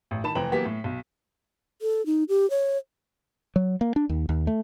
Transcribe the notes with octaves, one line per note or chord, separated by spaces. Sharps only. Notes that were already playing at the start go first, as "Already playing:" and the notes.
A1
D#3 A5 B5 E7
F1 E3 F3 G5 A#5 F#7
E3 F#3 A#3 B3 G4 B6
A2
B1
A4
D#4
G4
C#5
F#3
A#3
D4
D#2
D#2
A3